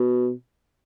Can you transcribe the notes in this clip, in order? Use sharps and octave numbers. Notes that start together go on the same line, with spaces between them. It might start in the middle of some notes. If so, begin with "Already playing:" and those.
Already playing: B2